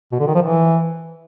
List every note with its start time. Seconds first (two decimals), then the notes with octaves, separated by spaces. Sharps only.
0.12 B2
0.19 D3
0.27 D#3
0.35 F3
0.42 E3